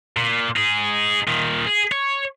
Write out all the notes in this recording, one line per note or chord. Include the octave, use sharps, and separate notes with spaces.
A#2
D#4 G#4
A#2 D#3
G#4
C#5